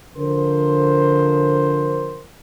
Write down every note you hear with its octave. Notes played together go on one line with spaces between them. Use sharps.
D3 F3 A#4 C5